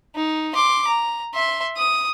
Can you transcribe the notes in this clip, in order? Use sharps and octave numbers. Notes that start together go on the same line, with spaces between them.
D#4
C6 D6
A#5
E5 C6
D#6